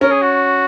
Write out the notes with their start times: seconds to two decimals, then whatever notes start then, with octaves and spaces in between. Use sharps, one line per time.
0.01 C#4 A#4
0.11 G#4
0.22 F#4